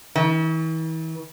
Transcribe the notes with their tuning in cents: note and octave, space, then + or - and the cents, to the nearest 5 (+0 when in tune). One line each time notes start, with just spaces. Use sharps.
E3 -40